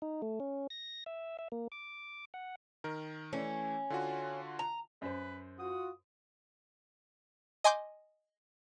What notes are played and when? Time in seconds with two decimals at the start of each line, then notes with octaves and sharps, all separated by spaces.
0.02 D#4
0.22 A3
0.40 C#4
0.70 A#6
1.06 E5
1.39 E5
1.52 A#3
1.72 D6
2.34 F#5
2.84 D#3 A#4
3.33 E3 A3 C#4
3.90 D3 F4 F#4
4.59 A#5
5.02 F#2 B4 C5
5.59 F4 F#4 D#6
7.64 D#5 G#5 C6 D6 G6